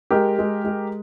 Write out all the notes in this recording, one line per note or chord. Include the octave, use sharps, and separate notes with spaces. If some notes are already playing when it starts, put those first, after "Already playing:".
G#3 G4 A#4
G#3
G#3